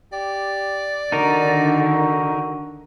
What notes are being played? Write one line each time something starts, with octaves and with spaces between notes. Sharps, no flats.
G4 D5
D3 D#3 D#4 F#4 A#4